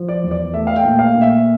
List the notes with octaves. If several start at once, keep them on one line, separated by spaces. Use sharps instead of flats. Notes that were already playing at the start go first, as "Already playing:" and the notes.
Already playing: F3
D5
E2
D5
A3 E5
F5
G5
A#2
F5
A#2
E5